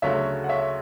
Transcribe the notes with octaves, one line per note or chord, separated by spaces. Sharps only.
D2 C#3 F#3 A3 C#5 E5
F#5
C#5 E5